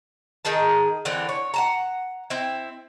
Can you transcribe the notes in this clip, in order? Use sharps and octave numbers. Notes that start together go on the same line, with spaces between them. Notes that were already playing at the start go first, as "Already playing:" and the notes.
D#3 D#4 G#4 A5
D3 E3 C4
C#5
F#5 A5 A#5
C4 E4